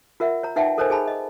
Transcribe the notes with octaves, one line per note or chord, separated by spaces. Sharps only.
F4 A#4 E5 F#5
C#5 A#5
D#4 B4 E5 F#5 G5 A5
A4 A#4 C5 C#5 D#5 G#5
G#4 G#5 A5 B5
D#5